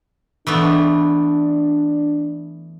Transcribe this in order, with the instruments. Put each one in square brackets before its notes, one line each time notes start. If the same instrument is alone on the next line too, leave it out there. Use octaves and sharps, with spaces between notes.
[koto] E3 A3 B3 [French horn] D4